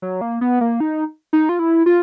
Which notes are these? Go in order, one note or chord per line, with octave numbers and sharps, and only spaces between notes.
F#3
A#3
B3
A#3
D#4
D#4
F4
E4
F4